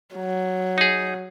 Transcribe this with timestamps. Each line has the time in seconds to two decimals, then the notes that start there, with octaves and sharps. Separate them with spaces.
0.16 F#3
0.78 D#4 G#4